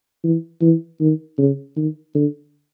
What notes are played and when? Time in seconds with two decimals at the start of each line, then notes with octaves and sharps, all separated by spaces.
0.24 E3
0.61 E3
1.00 D#3
1.38 C#3
1.77 D#3
2.15 D3